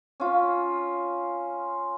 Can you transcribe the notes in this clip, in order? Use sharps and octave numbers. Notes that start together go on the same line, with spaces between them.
C#4 F4